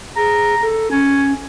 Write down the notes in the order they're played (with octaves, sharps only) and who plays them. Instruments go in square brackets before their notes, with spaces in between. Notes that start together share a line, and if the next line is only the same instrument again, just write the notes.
[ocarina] G#4 [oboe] A#5
[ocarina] A4
[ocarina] C#4 [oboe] G#5